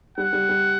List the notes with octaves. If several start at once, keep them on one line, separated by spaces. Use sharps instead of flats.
G3 F#5
G3
G3